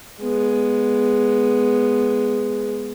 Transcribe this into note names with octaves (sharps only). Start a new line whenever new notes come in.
G#3 B3